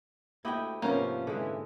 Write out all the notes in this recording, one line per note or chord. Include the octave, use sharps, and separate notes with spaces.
D2 A#3 E4 G4 D#5 F#5 G5
G#2 C3 F3 A#3 B3 C#4
D3 E3 G#3